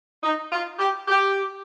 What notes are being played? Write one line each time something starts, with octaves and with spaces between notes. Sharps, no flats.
D#4
F4
G4
G4